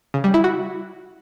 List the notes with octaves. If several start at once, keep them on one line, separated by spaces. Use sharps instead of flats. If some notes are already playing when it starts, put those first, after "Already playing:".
C#3
G3
E4
F#4